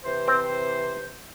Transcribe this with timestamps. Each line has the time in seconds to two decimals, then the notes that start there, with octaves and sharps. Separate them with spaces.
0.04 C3 E3 C5
0.27 C4 G5